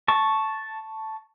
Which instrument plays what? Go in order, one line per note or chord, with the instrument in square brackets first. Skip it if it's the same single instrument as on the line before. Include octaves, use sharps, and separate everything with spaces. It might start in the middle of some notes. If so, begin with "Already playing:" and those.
[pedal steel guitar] A5 C#6